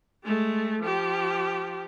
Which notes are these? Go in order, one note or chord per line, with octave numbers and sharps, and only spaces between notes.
G#3 A3
F3 G4